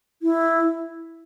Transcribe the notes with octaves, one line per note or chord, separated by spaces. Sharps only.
E4